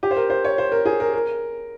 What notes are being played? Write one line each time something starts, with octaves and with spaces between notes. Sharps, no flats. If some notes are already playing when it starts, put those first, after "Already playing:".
G4
C5
A#4
C5
C#5
C5
A#4
G#4
A#4
A#4